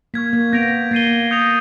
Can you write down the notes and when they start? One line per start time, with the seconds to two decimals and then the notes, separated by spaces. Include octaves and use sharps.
0.14 A#3 C#6 F6 G#6 B6
0.33 A#3
0.52 B3 G6 A#6 D7 F7
0.91 A#3 A6 C7 D#7 G7
1.31 D#6 G6 A#6 C#7 F7